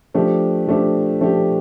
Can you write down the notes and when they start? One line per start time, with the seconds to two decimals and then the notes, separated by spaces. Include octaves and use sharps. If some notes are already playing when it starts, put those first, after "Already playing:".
0.14 F3 A3 D4 G4
0.68 F3 A3 D4 G4
1.21 F3 A3 D4 G4